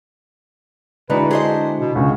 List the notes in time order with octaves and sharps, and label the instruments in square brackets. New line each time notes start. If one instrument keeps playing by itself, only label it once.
[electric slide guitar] D3 E4 F#4 [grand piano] G#3 D5 A#5 [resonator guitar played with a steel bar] D#4 [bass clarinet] B4
[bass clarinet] D4 [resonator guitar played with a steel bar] G#4 C5 D#5
[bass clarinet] B2
[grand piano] C#2 D3 [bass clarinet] C#4